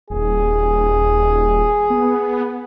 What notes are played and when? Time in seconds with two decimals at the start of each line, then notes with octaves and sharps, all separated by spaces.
0.10 D#1 G#4
1.90 B3